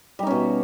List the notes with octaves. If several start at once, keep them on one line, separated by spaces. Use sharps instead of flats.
B2 G3 C#4 D#4